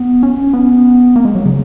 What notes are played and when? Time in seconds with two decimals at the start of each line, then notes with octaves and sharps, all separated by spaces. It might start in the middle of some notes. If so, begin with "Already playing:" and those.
Already playing: B3
0.23 C#4
0.53 B3
1.16 A#3
1.25 G#3
1.35 F#3
1.45 C#3